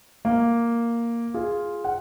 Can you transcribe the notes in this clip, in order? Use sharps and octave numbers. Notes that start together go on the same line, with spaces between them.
A#3
F4 G#4
F#5